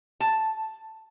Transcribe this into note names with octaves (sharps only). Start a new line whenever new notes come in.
A5